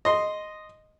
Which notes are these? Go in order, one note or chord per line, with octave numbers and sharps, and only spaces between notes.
D#5 C6